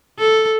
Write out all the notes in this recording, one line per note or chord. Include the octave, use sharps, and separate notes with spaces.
A4